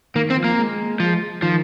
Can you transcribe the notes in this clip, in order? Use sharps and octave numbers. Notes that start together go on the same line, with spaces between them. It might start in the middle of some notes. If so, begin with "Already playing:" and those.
D#3 A#3
C4
F3
A#3
G#3
F3
D#3 F3